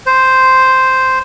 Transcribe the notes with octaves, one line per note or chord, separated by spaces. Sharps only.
C5